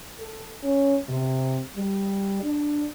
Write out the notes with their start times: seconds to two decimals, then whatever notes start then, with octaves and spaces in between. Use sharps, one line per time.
0.20 A4
0.63 C#4
1.09 C3
1.77 G3
2.43 D4